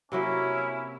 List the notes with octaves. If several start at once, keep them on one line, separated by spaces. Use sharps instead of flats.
C3 F#3 A#3 C#4 E4